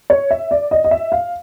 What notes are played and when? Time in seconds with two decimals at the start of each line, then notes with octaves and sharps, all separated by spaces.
0.10 C#5
0.31 E5
0.51 D5
0.71 D#5
0.84 D#5
0.91 E5
1.12 F5